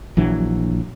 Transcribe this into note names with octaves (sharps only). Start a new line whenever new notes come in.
A#1 E3 F#3 D4